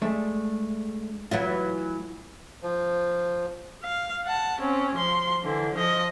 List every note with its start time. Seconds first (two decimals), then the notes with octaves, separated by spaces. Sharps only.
0.02 G#3 A3 D4
1.31 E3 F#3 A3 F4
2.63 F3
3.84 F5
4.25 F#5 A5
4.61 C4 C#4
4.95 F3 C6
5.44 D3 E3
5.74 F3 D#5